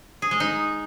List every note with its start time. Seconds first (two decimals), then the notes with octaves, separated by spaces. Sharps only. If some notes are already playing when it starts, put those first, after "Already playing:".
0.22 G#4
0.31 G#3
0.40 D#4